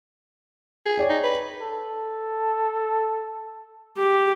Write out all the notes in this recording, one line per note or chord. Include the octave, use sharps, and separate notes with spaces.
G#4
C#5 D5 G5
D#4
B4
A4
G4